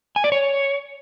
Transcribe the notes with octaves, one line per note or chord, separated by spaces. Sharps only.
G#5
D5
C#5